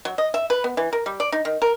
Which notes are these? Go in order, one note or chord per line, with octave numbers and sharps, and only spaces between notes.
F#3
D#5
E5
B4
B3
E3
A#4
G3
D5
D#4
D#3
A#4